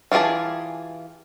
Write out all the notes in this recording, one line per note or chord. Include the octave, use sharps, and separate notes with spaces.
E3 F4 G4 G#4 A5